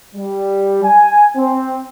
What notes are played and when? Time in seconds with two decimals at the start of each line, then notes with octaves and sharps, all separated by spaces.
0.15 G3
0.83 G#5
1.36 C4